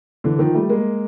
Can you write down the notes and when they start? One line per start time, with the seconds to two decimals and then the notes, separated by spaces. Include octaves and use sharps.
0.24 D3 E3
0.39 D#3 F3
0.54 G3 A3
0.69 G#3 A#3